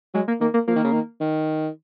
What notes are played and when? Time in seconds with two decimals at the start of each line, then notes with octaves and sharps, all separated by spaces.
0.14 F#3 G#3
0.28 A#3
0.40 D#3 A#3
0.54 A#3
0.68 F3 A#3
0.76 D#3
0.84 C#3
0.92 D#3
1.20 D#3